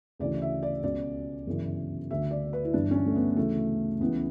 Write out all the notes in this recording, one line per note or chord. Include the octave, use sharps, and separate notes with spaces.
D2 C#3 E3 D5
E5
D5
C#2 B2 D5
G1 F#2 C#3 E3
D2 D3 E5
D5
B4
E4
G1 G2 E3 D4
C#4
D4
A3
B3
D2 C#3 E3 A3
C#2 C#3 E3 B3